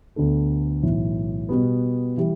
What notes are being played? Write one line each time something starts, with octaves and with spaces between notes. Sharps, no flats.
D2 D3 B3 D4 A4
B1 A2 E3
B2 G3 B3
E3 G3